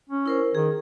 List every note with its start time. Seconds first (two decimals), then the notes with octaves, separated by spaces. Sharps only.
0.09 C#4
0.26 E4 A#4 C5
0.55 D#3 G#4